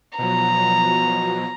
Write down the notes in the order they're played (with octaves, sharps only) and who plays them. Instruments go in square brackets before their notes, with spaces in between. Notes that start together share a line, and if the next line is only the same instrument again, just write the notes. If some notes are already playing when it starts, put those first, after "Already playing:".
[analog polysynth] B2 F3 F#3 [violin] A#5